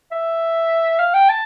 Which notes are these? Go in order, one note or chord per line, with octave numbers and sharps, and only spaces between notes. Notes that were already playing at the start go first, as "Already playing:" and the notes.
E5
F5
G5
A5